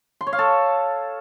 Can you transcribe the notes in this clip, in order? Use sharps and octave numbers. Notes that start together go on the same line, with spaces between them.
C6
C#5
F5
A4